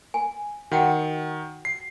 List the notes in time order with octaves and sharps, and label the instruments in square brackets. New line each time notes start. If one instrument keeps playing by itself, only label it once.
[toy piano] G#5
[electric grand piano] D#3 [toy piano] F#4 F#5 G5
[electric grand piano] C7